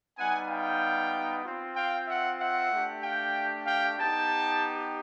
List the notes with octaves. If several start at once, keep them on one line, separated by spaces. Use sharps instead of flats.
G3 B3 D#4 F#5 G#5
F5 G5
C4 F4
F5 G5
E5 F#5
E5 F#5
A3 D4 G4
F5 G5
F5 G5
B3 D#4 G4 G5 A5